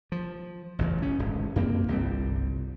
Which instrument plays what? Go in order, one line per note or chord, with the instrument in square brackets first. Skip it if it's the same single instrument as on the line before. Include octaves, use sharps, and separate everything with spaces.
[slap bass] F3
A1 E2 C#3
F#1 B2 C#4
D1 G#1 G#2
F#2 A#3 C4
G1 C2 G3 C4